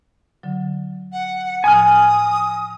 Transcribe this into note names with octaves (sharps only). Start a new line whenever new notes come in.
D3 F#3
F#5
A2 F3 G#5 D#6 F6